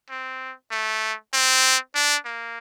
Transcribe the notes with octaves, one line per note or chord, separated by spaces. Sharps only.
C4
A3
C4
D4
A#3